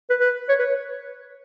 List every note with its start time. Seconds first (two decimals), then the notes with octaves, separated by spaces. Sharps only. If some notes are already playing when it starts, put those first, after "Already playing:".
0.10 B4
0.20 B4
0.49 C#5
0.59 B4